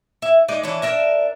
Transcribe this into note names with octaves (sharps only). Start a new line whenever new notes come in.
E4
G#3 D#4 D5
E3 C#4 D4
D4 A#4 E5